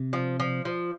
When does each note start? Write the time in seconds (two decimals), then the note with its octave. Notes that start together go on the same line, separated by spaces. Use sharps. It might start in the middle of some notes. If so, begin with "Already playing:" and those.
Already playing: C3
0.13 F3
0.40 F3
0.65 F3